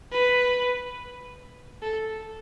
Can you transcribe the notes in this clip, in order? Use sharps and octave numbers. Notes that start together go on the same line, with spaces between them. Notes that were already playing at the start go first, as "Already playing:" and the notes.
B4
A4